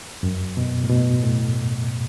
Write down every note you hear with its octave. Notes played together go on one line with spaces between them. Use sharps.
F#2
B2
A2
B2
A2